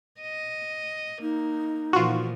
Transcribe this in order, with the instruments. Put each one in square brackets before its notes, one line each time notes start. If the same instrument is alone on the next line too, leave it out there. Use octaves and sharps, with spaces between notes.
[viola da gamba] D#5
[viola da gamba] A#3 [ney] D#4
[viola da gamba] A#2 E3 F3 [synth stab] F4 F#4